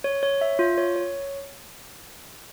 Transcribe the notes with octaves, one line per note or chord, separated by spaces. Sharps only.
C#5
C#5
E5
F4
C#5
C#5